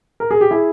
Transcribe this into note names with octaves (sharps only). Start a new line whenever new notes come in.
A#4
G#4
G4
E4 G#4